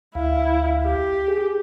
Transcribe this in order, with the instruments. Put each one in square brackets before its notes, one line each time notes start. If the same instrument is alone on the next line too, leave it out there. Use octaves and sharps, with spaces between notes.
[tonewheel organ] D2 F5 [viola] E4
[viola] G4
[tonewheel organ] G#4